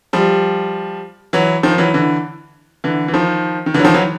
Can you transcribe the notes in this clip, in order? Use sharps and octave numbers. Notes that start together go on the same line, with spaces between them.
F3 G3
E3 F#3
D#3 F3
E3 F#3
D3 E3
D3 E3
E3
D#3 F3
D#3
D3 E3
F#3
D#3 F3
E3 F#3